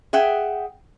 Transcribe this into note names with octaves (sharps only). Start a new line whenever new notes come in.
G#4 E5 F#5 G5